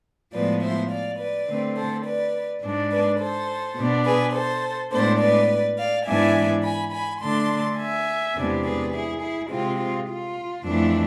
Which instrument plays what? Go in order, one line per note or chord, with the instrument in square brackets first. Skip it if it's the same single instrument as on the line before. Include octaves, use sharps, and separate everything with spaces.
[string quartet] A2 F3 G#3 B3 B4 D5
C5 E5
D5 F5
B4 D5
D3 A3 C4
A4 C5
B4 D5
G#2 G#3 D4
B4 D5
A4 C5
B2 B3 D4
G#4 B4
A4 C5
A2 G#3 B3 D4 A4 C5
B4 D5
D5 F5
G#2 E3 G#3 B3 D4 E5 G#5
G#5 B5
G#5 B5
D3 A3 D4 A5 C6
E5 G#5
E2 C3 G#3 B3 D4
G#4 B4
E4 G#4
E4 G#4
C3 G#3 C4 F4
F4
F4
F2 E3 A3 D4